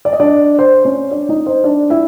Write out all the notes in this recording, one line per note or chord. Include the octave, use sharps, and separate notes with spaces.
D5
D#5
D4 D5
C5
C#4 C#5
D4 D5
D#4 D#5
C5
D4 D5
E4 E5